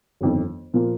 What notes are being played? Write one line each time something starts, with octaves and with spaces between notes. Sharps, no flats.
G1 F2 D#3
A#2 F3 A#3 F4